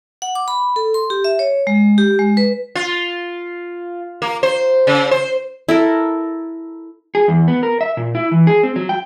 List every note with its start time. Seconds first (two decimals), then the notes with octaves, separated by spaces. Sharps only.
0.22 F#5
0.35 D6
0.48 B5
0.76 A4
0.94 C6
1.10 G4
1.24 E5
1.39 C#5
1.67 G#3
1.98 G4
2.19 G#3
2.37 B4
2.75 F4
4.22 A#3
4.43 C5
4.87 C#3
5.11 C5
5.69 E4 A4 A#4
7.15 G#4
7.28 E2
7.48 B3
7.63 A#4
7.81 E5
7.97 A#2
8.15 E4
8.32 E3
8.47 G#4
8.63 C4
8.76 F#3
8.89 G5